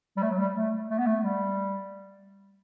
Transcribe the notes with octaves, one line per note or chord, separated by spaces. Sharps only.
G3
A3
F#3
G3
A3
A3
B3
A3
G3